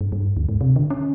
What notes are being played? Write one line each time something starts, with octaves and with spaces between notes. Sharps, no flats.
G2
G2
D2
G#2
C3
D3
C#4